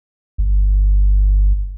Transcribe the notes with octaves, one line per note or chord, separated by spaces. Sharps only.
G1